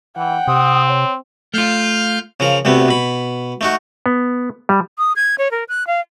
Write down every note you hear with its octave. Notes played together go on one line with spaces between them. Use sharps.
E3 F#5 G5
C3 C4 D#6
C#5
A3 F4 F5 F6 G6
C#3 F3 A#4
D2 C3 A3 B3
B2 B5
A3 D#4 F#4
B3
G3
D#6
G#6
C#5
A#4
F#6
F5